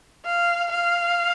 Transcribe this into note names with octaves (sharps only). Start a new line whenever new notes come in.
F5
F5